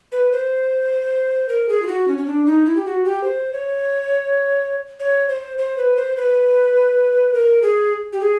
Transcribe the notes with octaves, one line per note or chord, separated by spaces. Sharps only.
B4
C5
A#4
G#4
F4
F#4
C#4
C#4
D4
D#4
E4
G4
F#4
G4
C5
C#5
C#5
C5
C5
B4
C5
B4
A#4
G#4
G4
G#4